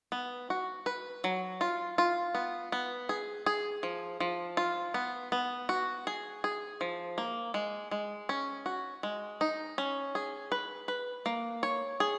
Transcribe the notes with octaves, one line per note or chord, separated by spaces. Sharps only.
B3
F#4
B4
F#3
F4
F4
B3
B3
G#4
G#4
F3
F3
F4
B3
B3
F#4
G#4
G#4
F3
A#3
G#3
G#3
C#4
F#4
G#3
D#4
C#4
G#4
B4
B4
A#3
C#5
G#4